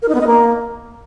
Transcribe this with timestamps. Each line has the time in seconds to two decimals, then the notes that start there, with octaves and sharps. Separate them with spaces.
0.02 A#4
0.08 D#4
0.15 B3
0.21 D#5
0.27 A#3